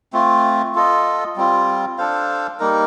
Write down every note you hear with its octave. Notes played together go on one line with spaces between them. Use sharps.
A3 C4 F4
F4 A4 D#5
G3 C4 F4
D4 A4 C5 F5
G3 A#3 D#4 A#4